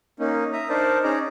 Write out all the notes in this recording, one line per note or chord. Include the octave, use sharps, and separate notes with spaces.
A#3 C#4 D#4
E5 A#5 D#6
D4 D#4 A#4 C5 D5 A5
C#4 D#4 G#4 D5 A#5